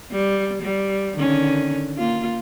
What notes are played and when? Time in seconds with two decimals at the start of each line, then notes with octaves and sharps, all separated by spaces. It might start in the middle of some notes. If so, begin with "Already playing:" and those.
0.11 G3
0.62 G3
1.15 D3 D#3 C#4
1.97 A#3 F4